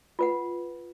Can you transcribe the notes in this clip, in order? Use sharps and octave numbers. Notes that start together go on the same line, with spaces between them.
F4 B4 F#5